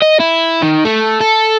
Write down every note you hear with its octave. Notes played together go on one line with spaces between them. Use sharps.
D#5
E4
D#3
A3
A4